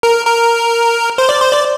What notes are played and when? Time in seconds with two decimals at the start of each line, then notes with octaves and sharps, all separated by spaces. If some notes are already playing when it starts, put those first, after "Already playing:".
0.03 A#4
0.27 A#4
1.18 C5
1.29 D5
1.41 C5
1.52 D5